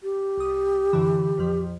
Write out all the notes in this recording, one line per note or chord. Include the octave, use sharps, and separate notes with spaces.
G4
C2 D#6
F#2 D3 E3
A#1 F2 F3